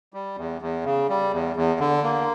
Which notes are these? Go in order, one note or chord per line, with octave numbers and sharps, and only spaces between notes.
G3
E2
E2
C#3
G3
E2
E2
D3
A#3